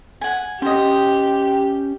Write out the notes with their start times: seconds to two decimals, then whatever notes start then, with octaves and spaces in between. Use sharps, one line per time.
0.21 F#5 G#5
0.62 C#4 G4 C5 D#5